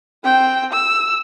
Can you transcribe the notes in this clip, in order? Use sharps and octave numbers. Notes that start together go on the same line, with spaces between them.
C4 G5
E6